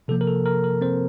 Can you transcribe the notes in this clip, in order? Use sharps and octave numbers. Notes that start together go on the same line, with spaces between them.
C3 F3 A#3 A4
A#4
A4
A#4
A#4
C4 C5